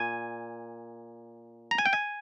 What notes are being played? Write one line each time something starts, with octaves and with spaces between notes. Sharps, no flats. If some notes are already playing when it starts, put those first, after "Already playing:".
Already playing: A#2 G#5
A#5
G#5
G5
G#5